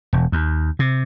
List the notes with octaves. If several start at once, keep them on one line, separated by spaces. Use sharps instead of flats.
E1
D#2
C3